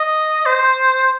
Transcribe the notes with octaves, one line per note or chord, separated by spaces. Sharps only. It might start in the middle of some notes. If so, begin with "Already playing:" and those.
Already playing: D#5
C5